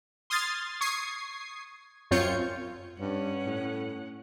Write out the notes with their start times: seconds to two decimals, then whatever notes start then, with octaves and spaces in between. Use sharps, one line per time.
0.30 C6 D#6 F6 G#6 A6 C7
0.81 C#6 D#6 G#6 C7
2.11 F#2 C4 F4 C#5 G6 C#7
3.00 G2 C#4 F#5
3.47 A2